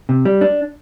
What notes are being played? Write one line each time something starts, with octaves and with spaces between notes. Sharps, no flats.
C3
G3
D4